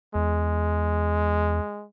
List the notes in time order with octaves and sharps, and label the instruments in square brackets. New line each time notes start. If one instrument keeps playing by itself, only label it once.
[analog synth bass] E2 [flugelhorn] G#3